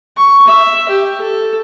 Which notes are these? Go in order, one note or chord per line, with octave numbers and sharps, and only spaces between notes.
C#6
E5
G4
A4